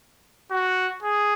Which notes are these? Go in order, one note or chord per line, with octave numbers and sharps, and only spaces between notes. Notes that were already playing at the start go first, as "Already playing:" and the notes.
F#4
G#4